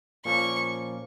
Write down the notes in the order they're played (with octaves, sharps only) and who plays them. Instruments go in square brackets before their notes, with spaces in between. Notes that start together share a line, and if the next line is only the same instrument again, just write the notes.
[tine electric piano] A#2 F3 A#3 C#4 [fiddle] C#6